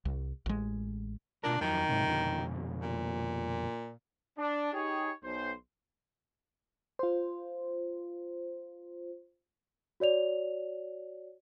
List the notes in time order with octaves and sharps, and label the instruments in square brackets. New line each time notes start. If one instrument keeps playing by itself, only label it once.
[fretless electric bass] C2
A1 G#3
[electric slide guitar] B2 F4 A#4 [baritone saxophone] D4
[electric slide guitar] F2 F#3 A#5 [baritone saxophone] D#3
[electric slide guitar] G#2 C3
F2 B2 D3
[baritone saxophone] A#2
[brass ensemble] D4
D#4 G4 G#4 C#5
B1 C5
[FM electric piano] F4 C5
[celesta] F#4 C#5 D5 F7